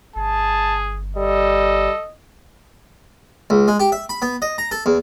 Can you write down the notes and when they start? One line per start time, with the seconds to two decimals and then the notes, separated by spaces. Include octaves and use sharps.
0.16 G1 G#4 A5
1.16 G3 A4 D#5
3.50 C#2
3.68 G#3
3.80 G4
3.92 E5
4.09 B5
4.22 B3
4.42 D#5
4.58 A#5
4.71 A4
4.86 E2